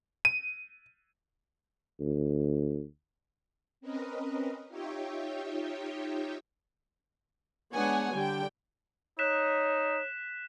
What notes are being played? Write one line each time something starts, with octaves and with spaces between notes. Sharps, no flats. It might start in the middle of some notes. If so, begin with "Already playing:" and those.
D#7
D2
C4 C#4 A#4 B4 D#5
D#4 F4 G4 C#5 E5 G5
G#3 B3 D4 C#5 F#5 G#5
D3 G3 G4 G5
D#4 C#5 F#6 B6 E7